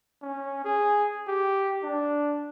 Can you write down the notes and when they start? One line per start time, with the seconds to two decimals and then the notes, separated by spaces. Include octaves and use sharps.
0.22 C#4
0.65 G#4
1.28 G4
1.83 D4